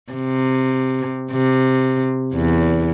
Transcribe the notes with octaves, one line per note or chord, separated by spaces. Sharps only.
C3
C3
E2